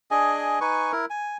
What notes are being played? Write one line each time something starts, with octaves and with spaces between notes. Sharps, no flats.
D4 G#4 D#5 G#5
D#4 B4 G#5 C#6
E4 A#4
G#5